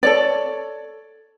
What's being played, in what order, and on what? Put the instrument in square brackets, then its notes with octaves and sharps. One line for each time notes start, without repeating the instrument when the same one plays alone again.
[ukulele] A4 C#5 D5